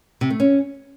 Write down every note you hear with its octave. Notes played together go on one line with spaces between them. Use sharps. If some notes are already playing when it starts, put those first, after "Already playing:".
C3
A3
C#4